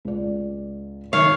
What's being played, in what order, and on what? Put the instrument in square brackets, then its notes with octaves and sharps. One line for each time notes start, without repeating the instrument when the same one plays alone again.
[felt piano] C#2 D5
[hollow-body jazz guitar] F#2 D#3 [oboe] C#5 [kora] F5